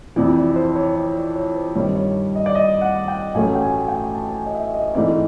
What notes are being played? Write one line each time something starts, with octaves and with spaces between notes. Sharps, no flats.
F2 C3 E3 D5
D5
C5
C#5
C#5
D5
C#5
C5
G2 D#3 G3 C4 C#5
C#5
D#5
D5
D#5
F#5
G5
A1 A2 F#3 A3 C#4 G#5
G5
G#5
G5
A5
G#5
D#5
E5
D#5
G#2 E3 A3 C4 D#4 D5